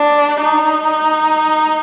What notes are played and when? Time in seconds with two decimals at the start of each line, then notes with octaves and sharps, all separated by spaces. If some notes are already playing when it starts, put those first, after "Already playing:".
Already playing: D4
0.42 D#4